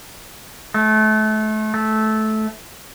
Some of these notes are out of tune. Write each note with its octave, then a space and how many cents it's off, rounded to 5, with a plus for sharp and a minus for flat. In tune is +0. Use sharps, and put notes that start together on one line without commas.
A3 -30
A3 -15